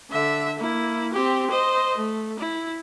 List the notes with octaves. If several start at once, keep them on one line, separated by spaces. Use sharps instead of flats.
D3 E5
A#3 E4
C4 G4
C5 D#5
A3
E4